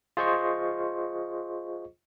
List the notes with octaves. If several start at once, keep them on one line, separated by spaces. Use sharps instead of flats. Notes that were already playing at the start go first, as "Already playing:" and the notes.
F4 G#4 C5 D#5 C#6